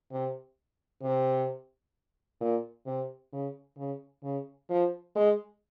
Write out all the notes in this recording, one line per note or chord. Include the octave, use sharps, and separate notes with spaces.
C3
C3
A#2
C3
C#3
C#3
C#3
F3
G#3